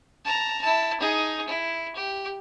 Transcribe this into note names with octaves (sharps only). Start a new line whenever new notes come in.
A5 A#5
E4 A5
D#4 G#4
E4
G4